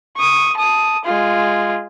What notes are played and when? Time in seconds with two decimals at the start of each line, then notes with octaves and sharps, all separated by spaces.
0.17 C#6 D#6
0.57 A5 D#6
1.05 G#3 F4